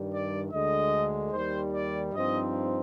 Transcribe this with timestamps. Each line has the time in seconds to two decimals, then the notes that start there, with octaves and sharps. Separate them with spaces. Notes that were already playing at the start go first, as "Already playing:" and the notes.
Already playing: G2 D#3 G3
0.13 D5
0.52 D2 D3 G#3 D#5
1.32 D#2 D#3 G3 C5
1.74 D5
2.13 G2 F3 C4 D#4 D#5